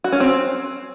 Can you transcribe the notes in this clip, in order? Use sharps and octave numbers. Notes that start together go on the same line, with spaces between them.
F#4
C#4
C4